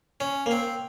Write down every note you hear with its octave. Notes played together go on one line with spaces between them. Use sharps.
C#4
A#3
C4